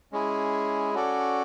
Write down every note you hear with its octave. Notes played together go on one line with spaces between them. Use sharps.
G#3 C#4 E4 G#4
C#4 F#4 A4 D5